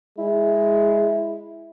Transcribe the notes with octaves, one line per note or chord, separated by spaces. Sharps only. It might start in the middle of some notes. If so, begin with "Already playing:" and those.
G#3 E4